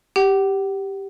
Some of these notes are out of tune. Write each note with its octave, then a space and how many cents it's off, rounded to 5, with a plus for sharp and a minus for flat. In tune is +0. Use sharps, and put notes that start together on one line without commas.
G4 +0 F#5 +40